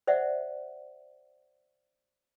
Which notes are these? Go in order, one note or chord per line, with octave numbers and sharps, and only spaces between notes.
C5 D5 E5 F#5